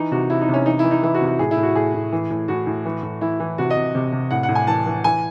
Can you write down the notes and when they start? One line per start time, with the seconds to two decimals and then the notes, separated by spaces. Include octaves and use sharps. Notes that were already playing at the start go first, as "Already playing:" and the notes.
Already playing: E3 D#4
0.11 C3 F#4
0.30 C3 E4
0.42 D#4
0.48 C3
0.54 C#4
0.66 E3 D#4
0.79 E3 E4
0.91 D#4
1.03 E3 E4
1.15 F#4
1.21 C3
1.27 F#4
1.39 A2 G#4
1.51 E4
1.57 A2
1.63 F#4
1.75 A2 G#4
1.94 A2
2.13 E3
2.30 A2
2.48 A2 F#4
2.67 A2
2.85 E3
3.03 A2
3.21 E3 E4
3.40 E3
3.58 C3 F#4
3.70 D#5
3.77 C3
3.95 C3
4.13 C3
4.31 A2 F#5
4.43 F#5
4.49 A2
4.55 G#5
4.67 E3 A5
4.86 E3
5.04 E3 G#5